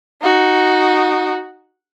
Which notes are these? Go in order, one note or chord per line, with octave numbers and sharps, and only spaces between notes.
D#4 F#4